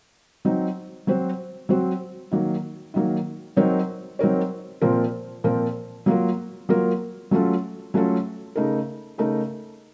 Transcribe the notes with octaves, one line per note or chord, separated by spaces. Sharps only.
F#3 C4 D#4
F#3 C4 F#4 C5
F#3 C4 F#4 C5
D#3 F#3 A#3
D#3 F#3 A#3
F#3 C4 D#4 A#4 C#5
F#3 C4 D#4 A#4 C#5
A#2 F3 C4 F4 A#4
A#2 F3 C4 F4 A#4
F#3 A#3 F4 A#4
F#3 A#3 F4 A#4
F#3 A3 C#4 F4 A4
F#3 A3 C#4 F4 A4
C#3 A3 D#4 A#4
C#3 A3 D#4 A#4